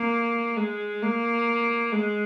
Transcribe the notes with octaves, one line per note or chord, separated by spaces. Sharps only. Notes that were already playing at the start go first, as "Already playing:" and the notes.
Already playing: A#3
G#3
A#3
G#3